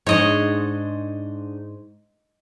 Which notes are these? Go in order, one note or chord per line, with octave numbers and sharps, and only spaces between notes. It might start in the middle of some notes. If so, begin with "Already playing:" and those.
G#2 D4 D#4 C#5 D#5